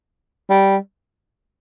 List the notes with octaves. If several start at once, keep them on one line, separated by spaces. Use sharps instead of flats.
G3